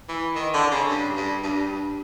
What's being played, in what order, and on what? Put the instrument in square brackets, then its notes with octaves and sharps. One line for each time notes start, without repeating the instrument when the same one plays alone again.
[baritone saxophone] E3
D#3
D3
C#3
G2
G2
G2